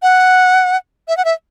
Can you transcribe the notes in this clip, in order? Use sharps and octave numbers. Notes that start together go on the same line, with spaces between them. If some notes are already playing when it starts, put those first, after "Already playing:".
F#5
E5
F#5
E5